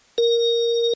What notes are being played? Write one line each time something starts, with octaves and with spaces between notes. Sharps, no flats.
A#4